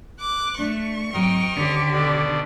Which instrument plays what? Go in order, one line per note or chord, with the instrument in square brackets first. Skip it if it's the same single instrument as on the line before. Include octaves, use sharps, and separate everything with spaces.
[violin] D6 F#6
[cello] A3 [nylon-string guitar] D4 [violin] C#6
[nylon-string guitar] G#2 F#3 C4 [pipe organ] D#5 F6 [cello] G5
[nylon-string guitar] D2 D#3 C#4 [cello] D3 G4
[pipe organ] B2 D4 [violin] A4